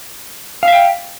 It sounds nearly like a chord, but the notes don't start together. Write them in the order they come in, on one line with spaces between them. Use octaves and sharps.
F5 E5 G5